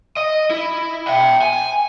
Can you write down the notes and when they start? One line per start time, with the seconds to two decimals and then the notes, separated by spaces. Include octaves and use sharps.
0.17 D#5
0.50 E4
1.07 E5 G5
1.42 G#5